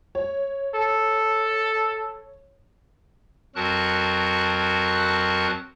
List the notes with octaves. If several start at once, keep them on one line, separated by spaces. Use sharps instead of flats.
C#5
A4
F2 F#3 F#4 A#4 A5 F#6